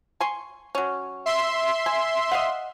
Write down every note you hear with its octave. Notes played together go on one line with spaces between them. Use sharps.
G#5 C6 C#6
F#3 C#4
E5 C6
G#5
D#5 F5 F#5